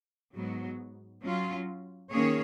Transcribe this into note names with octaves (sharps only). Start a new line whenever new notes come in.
G#2 F#3 B3
F#3 C#4 F4
D#3 A#3 C#4 G#4 C#5